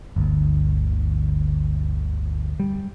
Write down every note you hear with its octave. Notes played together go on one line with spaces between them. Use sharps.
G1 D2
G3